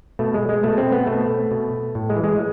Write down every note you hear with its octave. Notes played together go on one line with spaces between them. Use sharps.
B2 A3
G#3
G#3
B2 A3
C4
B3
B2 A3
B2
A2
G#3
E3
G#3